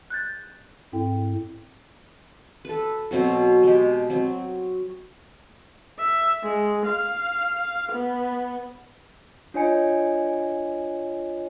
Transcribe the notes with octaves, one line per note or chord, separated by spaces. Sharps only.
F#6 G6 A6
G#2 C4 E4 A4 G5
A4 B4
B2 F#3 C4 F#4
G#3 G4
F#3 C4
E5
G#3
F5
B3
D4 F4 C#5 D#5 G#5 C#7